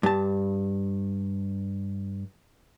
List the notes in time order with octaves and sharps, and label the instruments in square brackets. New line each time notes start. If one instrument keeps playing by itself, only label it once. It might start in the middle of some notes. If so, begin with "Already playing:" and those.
[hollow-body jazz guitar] G2 A5